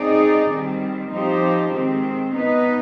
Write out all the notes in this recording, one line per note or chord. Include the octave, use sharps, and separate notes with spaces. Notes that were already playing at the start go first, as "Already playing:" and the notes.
Already playing: G#3 C4 D#4 G#4 D5
D#3 G3 C4
F3 C4 D#4 G4 C5
D#3 G#3 C4
B3 D#4 B4 D#5